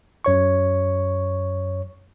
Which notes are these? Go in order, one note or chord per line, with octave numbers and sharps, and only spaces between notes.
F#2 C#5 C#6